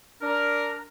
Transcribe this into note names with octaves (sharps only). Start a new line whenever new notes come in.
D4 A#4